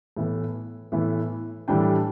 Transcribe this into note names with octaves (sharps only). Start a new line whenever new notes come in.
A2 E3 B3 E4
A2 E3 B3 E4
A2 E3 G3 D4 G5